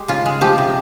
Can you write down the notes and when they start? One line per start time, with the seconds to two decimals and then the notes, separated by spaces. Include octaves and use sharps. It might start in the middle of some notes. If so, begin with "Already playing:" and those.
Already playing: G#3 G4
0.08 C#3 F4
0.26 G#3
0.41 F3 G4
0.58 C3